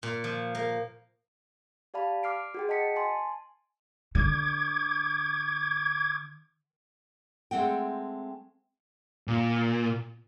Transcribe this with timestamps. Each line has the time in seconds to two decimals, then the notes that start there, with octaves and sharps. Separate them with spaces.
0.03 A#2
0.24 F3
0.55 A#3
1.94 G4 D5 F5 A5 B5
2.23 D6 F6 C7 D7
2.54 F#4 G#4 G5
2.69 D#5 F#5 A5 B6 C#7
2.96 G#5 A5 C6
4.15 D3 D6 G#6
7.51 G#3 A3 C4 F#5 G5
9.28 A#2